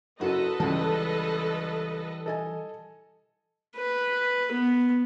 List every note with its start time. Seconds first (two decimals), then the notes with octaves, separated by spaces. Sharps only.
0.20 F#1 F#4 A4 B4 D#5
0.60 C#2 E3 G3 A5
2.26 A4 D#5 G#5
3.77 B4
4.52 B3